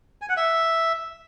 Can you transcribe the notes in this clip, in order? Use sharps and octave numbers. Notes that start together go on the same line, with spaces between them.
G#5
F#5
E5